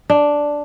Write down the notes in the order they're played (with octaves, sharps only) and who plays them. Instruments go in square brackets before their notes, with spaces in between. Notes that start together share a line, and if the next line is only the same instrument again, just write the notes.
[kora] D4